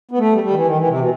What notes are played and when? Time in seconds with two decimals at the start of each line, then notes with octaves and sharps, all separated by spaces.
0.11 B3
0.18 A3
0.33 G3
0.43 G3
0.50 D#3
0.55 E3
0.66 D#3
0.77 E3
0.88 C3
0.98 B2